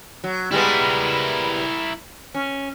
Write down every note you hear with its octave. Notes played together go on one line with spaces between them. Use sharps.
F#3
G3 G#3 B3 E4 A#4
C#4